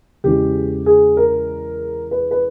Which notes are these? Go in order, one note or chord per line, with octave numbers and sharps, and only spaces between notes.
E2 C#3 E3 G#3 G4
G#4
A#4
B4
B4